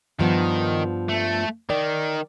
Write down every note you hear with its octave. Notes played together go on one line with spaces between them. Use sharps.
G2 D#3 F3 B3
A3
D#3 D5